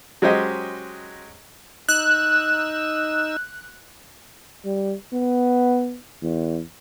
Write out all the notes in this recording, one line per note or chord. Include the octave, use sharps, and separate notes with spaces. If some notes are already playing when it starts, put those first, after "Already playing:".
F#3 G#3 C#4 G4 C5 D#5
D#4 E6 F#6
G3
B3
E2